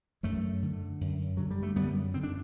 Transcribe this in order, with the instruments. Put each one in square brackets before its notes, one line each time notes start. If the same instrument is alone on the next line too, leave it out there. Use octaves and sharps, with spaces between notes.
[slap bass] F#2 F#3 A3
D3
F#2
D3 F#3
G3
A3
F#2 G3 B3
D3 C4
D4